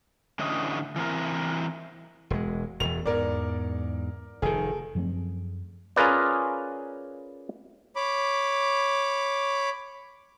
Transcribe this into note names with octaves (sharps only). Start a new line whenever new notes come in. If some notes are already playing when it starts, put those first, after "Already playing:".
A2 D3 E3 C#4 D#5
E3 C4 A#4
E1 G#3
E1 E2 F7
E2 G#2 A#4 D5
F1 G#2 D#3 G#4 A4
F#2 F3 A3 C4
C#4 F4 G#4 A#4 B4 D5
C#5 B5 D6